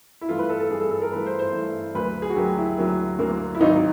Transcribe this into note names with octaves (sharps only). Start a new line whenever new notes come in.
E4
G2 E3 A3 F4
B4
A4
A4
G2 E3 A3 G#4
A4
A4
A#4
G2 E3 A3 B4
C5
C5
G2 E3 A3
D2 D3 F#3 A#3 B4
G#4
F#4
D2 D3 F#3 A#3 G4
E4
D2 D3 F#3 A#3
D2 D3 F#3 A#3
E4
G#1 G#2 D#3 F#3 D#4